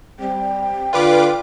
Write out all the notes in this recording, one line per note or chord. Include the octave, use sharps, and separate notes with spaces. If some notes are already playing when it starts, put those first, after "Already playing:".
G3 C4 G5
D3 F4 B4 D5 D6